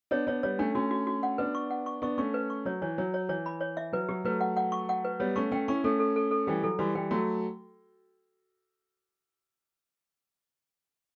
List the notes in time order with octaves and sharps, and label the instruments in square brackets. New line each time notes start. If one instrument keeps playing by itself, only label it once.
[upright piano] B3 D4 [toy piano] C#5
[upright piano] B3 D4 [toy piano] C#5
[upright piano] G3 B3 [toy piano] C#5
[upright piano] A3 C#4 [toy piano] D4
[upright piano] A3 C#4 [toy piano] F#4
[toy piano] F#4
F#4
F#5
[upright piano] B3 D4 [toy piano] B4
[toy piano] C#6
F#5
C#6
[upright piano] B3 D4 [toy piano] C#6
[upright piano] A3 C#4 [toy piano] C#6
[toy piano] B4
C#6
[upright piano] F#3 [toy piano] C#5
[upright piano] E3 [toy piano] C#5
[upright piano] F#3 [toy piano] C#5
[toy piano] C#5
[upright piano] E3 [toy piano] C#5
[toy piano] B5
C#5
E5
[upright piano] F#3 [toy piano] B4
[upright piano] F#3 [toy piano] G4
[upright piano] F#3 A3 [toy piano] B4
[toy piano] F#5
F#5
C#6
F#5
B4
[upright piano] G3 B3 [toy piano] C#5
[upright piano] A3 C#4 [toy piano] C#6
[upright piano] A3 C#4 [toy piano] G5
[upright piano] C#4 E4 [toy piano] C#6
[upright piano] A3 C#4 [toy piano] A4
[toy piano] A4
A4
A4
[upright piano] E3 G3 [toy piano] G5
[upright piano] F#3 [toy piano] A4
[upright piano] E3 G3 [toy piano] F#4
[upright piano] E3 G3 [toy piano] G5
[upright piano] F#3 A3 [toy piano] F#4